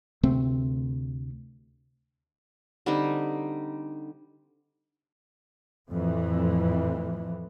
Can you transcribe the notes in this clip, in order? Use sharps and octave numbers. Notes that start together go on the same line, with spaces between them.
D2 C3 A3 C4
D3 G3 C4 D#4
F2 A2 E3